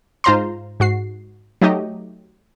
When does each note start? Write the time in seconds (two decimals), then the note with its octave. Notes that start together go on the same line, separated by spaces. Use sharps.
0.24 G#2 F4 C5 A#5 C6
0.80 G#2 F#4 C7
1.61 F#3 A3 D#4 G4 D#5